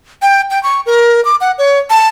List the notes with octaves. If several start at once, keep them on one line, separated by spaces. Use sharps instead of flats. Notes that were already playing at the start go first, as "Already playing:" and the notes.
G5
G5
C#6
A#4
D6
F#5
C#5
A5